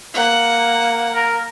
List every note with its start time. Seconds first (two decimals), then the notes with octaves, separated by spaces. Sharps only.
0.14 A#3 F#5
1.15 A#4